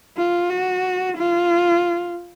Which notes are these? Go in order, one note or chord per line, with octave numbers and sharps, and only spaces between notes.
F4
F#4
F4